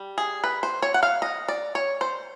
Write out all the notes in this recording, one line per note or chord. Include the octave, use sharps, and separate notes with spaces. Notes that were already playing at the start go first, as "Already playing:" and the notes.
Already playing: G3
G#4
B4
C5
C#5
F#5
F5
D#5
D5
C#5
C5